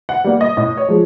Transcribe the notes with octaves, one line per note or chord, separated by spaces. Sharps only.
F#5
G3 A#3
D#5
A2 D#5
C#5
F3 G#3